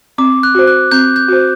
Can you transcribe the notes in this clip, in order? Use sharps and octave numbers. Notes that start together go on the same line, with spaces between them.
C4 D6
F#6
F#4 C5
F#6
C4 G6
G6
F#4 C5